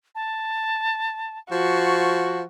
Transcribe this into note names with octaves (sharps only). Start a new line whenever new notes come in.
A5
F3 F#4 C#6